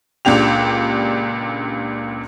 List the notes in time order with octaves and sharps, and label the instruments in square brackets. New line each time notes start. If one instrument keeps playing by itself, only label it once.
[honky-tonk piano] C#2 A#2 D4 G4 F7